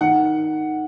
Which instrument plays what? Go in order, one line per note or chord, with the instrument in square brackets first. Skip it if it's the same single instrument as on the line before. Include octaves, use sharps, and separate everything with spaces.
[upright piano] D#3 F#5